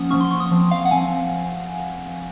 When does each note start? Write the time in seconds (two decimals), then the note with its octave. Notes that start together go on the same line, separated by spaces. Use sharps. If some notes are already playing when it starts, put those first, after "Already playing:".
Already playing: F3 A#3 C#4 F#5 D#6
0.11 F3 A#3 C#4 C#6
0.21 C6
0.31 C#6
0.40 D#6
0.51 F3 C4
0.71 F5
0.85 F#5
0.91 F3 C4 G#5